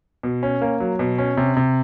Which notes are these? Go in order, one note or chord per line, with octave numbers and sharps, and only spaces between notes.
B2
C#4
A#3
F#3
B2
C#4
C3
C3